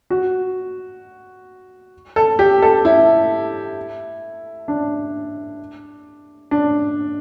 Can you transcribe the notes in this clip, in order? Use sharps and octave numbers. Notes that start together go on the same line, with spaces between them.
F#4
A4
G4
A4
E4
D4
D4